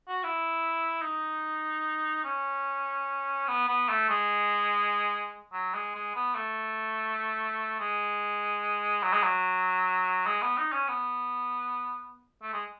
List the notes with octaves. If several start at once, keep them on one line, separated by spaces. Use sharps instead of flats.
F#4
E4
D#4
C#4
B3
B3
A3
G#3
F#3
G#3
G#3
B3
A3
G#3
F#3
G#3
F#3
G#3
B3
D#4
C#4
B3
A3
G#3